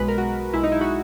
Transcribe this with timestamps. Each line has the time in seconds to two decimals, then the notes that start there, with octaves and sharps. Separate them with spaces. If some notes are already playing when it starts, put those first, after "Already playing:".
Already playing: B1 B2 G#3 B4
0.08 A#4
0.18 F#4
0.53 B1 B2 G#3 E4
0.63 D#4
0.72 E4
0.81 F#4